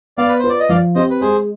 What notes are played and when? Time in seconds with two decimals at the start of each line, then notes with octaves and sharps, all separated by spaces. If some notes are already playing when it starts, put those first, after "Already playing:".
0.18 B3 D5 F5
0.29 B4
0.39 F4 B4 C5
0.49 D5
0.60 D#5
0.69 F3 D5 F5
0.95 C4 G4 C5 D#5
1.10 B4
1.21 G#3 G#4 C5